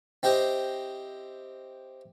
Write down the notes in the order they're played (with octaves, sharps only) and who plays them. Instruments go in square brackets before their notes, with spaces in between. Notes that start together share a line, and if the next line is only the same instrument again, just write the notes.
[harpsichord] C4 E4 G4 C5 D#5